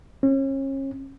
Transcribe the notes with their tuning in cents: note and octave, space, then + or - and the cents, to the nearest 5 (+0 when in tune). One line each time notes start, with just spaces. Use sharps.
C#4 -35